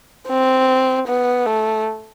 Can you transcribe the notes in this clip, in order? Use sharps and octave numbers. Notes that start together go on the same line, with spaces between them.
C4
B3
A3